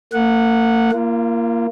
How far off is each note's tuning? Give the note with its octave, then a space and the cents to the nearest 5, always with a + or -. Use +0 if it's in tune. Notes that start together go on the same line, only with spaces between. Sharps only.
A#3 -45 F#5 -15
A#3 +0 F4 -40